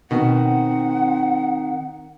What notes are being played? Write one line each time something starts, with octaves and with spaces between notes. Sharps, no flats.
B2 D#3 C4 F#5